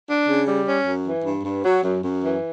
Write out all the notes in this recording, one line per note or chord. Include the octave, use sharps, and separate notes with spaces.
D4
C#3
G3
C#4
F#2
E3
G2
G2
F#3
F#2
F#2
E3